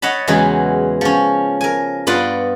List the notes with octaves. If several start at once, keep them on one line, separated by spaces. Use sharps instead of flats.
C#5 D#5 F#5 A5 B5
E2 C#3 E3 F#3 G#3
F3 C#4
A#4 G#5
G2 B3 F4 D5 F#5 C6